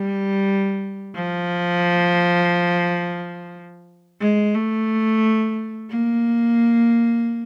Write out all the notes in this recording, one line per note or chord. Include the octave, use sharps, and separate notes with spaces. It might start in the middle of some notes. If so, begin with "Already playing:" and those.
Already playing: G3
F3
G#3
A3
A#3